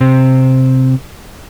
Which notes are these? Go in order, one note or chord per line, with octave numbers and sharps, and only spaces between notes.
C3 C4